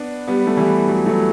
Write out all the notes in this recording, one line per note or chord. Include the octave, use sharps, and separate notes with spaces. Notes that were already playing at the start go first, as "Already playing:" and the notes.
Already playing: B3 D4
G3 B3
A3
E3 G3
F#3 A3
F#3 A3